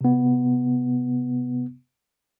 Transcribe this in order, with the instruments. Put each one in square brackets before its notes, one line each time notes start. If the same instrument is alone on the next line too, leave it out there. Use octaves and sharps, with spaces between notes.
[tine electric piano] C3 B3